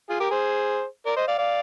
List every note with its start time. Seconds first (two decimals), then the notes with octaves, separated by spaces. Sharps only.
0.09 F4 G#4
0.20 G4 A#4
0.31 G#4 C5
1.06 A#4 D5
1.17 C5 D#5
1.28 D5 F5
1.38 D5 F5